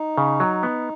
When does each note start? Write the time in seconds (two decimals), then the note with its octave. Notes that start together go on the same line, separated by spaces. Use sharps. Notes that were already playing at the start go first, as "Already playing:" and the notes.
Already playing: D#4
0.18 C#3
0.40 F#3
0.63 B3